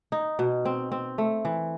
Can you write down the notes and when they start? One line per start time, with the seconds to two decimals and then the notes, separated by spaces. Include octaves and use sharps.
0.12 D#4
0.39 B2
0.65 C4
0.92 C4
1.18 A3
1.45 E3